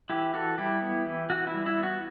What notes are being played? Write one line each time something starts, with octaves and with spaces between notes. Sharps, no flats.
E3 E4 G4
E3 F#4 A4
G3 E4 G4
B3
E3
E3 F#4
E4
G3
E4
B3
F#4